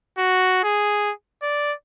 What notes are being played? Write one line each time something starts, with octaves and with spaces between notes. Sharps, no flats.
F#4
G#4
D5